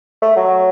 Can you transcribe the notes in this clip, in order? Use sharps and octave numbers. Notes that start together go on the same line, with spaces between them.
A3
F#3